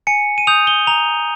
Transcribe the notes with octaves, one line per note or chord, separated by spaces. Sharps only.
G#5 C#7
D#7
D#6 G6 F7
G7
A#5 F7